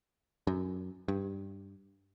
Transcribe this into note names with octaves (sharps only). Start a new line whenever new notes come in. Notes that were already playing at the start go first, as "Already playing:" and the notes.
F#2
G2